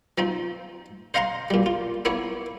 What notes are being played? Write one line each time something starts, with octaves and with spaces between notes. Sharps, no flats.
F3 C4 D#4
C5 D#5 F5 F#5 A#5 C6
A#2 G3
F4
A#3 B3 E4 C#5